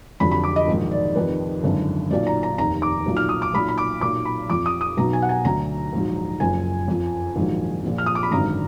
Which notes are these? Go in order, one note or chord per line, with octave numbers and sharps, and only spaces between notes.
F1 F2 D3 F#3 B5
B5
D6
D#5
A#1 G#2 D#3 F#3
D5
F1 F2 D#3 B4
G#1 F#2 D3
B1 A#2 F#3 D5
A#5
A#5
F1 D#2 D#3 A#5
D6
B1 A#2 F#3
F6
D#6
D6
B1 A#2 F#3 B5
B5
D6
B1 A#2 F#3 D6
B5
F2 F3 D6
D#6
D#6
B1 B2 F#3 A#5
G#5
F#5
G#5
D2 D3 F#3 A#5
A#1 G#2 F#3
F#1 F#2 F3 G#5
F2 F3
A#1 G#2 D#3 F#3
A#1 A#2 F3
F6
D#6
D6
B5
G#1 F#2 D3 F#3 A#5